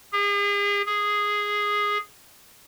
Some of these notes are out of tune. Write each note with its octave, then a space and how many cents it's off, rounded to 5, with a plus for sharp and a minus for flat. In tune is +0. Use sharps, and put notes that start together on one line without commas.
G#4 -40
G#4 -5